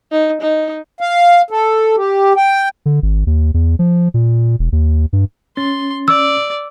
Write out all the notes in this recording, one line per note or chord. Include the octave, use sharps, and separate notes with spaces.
D#4
D#4
F5
A4
G4
G5
D3
G#1
D#2
E2
F3
A#2
E1
D#2
G2
C#4 C6 A6
D5 E6